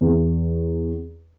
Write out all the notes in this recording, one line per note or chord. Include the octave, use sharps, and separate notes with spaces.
E2